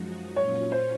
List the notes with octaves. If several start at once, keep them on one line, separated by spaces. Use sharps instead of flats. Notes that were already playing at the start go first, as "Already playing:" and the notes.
Already playing: F#2 F3 G#3 D#4 F#4
A#2 F#3 C#4 F4 C#5
C5